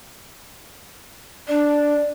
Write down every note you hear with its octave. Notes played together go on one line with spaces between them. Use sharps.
D4 D5